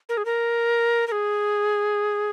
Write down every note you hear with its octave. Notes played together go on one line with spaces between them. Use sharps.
A#4
G#4
A#4
A#4
G#4